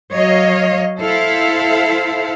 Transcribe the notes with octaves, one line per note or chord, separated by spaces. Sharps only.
F#3 C#5 D#5 F5
E4 A4 C5 F5